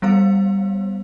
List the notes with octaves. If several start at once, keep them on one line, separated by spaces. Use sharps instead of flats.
G3 B3 C5 F5